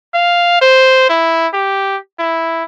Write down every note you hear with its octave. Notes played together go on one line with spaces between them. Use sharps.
F5
C5
E4
G4
E4